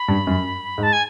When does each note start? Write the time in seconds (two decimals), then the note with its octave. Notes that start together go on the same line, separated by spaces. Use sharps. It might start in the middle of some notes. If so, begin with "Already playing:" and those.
Already playing: B5
0.08 G2
0.27 F#2
0.78 G#2
0.83 A5
0.93 G#5